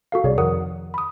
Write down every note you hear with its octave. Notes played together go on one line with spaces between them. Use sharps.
F#4 A4 F5
C2 C3 G3 G#4 C#5 D5
F2 D#3 A#4 F#5 D#6
B5 D#6